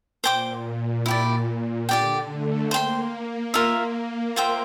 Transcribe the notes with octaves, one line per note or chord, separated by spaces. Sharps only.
A#2 C5 G5 D6
A#2
A#2 E4 G4 D5
A#2
D3 G4 D5 G5
A3
A#3 C5 G5 C6
A#3
F4 A#4 E5
F4 C5 E5 G5